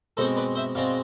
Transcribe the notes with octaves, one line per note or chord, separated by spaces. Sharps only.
B2 G#3 C4 A4 C5
B4 D5
C5 E5
B2 G#3 C4 D5 F5